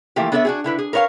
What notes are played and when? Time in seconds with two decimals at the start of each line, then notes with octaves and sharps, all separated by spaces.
0.16 E3 F3 A3 A#3 G4
0.32 B3 D4 A4 C#5 D#5 E5
0.45 D4 F#4 G#4
0.64 D3 E4 B4
0.79 G#4
0.93 A#4 B4 C#5 D#5 F5